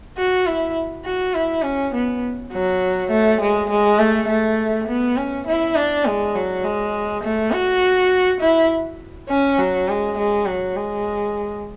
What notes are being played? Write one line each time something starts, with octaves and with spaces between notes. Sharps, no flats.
F#4
E4
F#4
E4
C#4
B3
F#3
A3
G#3
G#3
A3
A3
B3
C#4
E4
D4
G#3
F#3
G#3
A3
F#4
E4
C#4
F#3
G#3
G#3
F#3
G#3